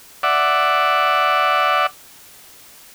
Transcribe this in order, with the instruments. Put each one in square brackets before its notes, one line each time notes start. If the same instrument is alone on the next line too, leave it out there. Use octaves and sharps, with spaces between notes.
[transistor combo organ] D5 E5 F#5